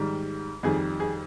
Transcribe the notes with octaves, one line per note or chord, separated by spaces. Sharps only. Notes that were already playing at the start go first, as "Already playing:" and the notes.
Already playing: G#2 D#3 G3
F2 D#3 G3 G#4
G#4